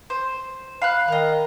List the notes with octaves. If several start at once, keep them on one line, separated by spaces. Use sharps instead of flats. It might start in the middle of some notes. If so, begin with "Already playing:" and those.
C5
F5 B5 F#6
D#3 D#5 F5